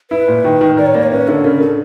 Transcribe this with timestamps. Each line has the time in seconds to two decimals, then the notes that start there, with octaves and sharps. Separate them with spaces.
0.11 E4 B4
0.28 A#2
0.45 D#3
0.61 D#3
0.77 A#4 D5
0.86 C#5
0.94 A#3 D5
1.03 C#5
1.11 C#4 B4
1.28 D3 A4
1.44 C#3 A#4
1.61 C#3 A4